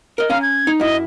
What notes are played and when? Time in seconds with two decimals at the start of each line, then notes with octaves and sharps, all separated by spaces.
0.18 A#4 D#5
0.30 C#4 F5 G#5 A#5
0.42 G#6
0.67 D#4
0.80 F#2 E4 D#5